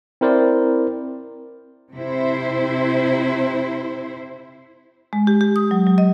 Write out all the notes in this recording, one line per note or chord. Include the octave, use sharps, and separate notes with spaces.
C4 E4 A#4 C5 D5
C3 E4 C5
G#3
G4
G4
D#6
F#3
F#3
D#5